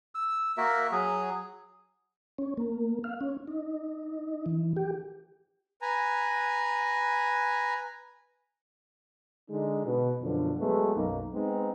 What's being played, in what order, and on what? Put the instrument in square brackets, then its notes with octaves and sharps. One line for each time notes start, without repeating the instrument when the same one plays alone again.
[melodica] E6
A#3 F#4 A#4 E5
F#3 G#4
[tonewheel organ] C#4
A#3
F5
C#4
D#4
E3
G4
[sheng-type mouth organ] B4 G#5 A#5
[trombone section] D3 G#3 D#4
B2
F#2 B2 D3 F3 D4
F#3 G#3 A3 B3
B1 F#2 A#3 D#4
G#3 B3 C4 D#4